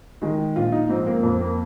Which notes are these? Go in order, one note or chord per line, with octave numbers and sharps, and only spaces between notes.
D#3 G#3
A#1 F4
D#4
G#2 F3 C4
A#3
F2 C4
A#3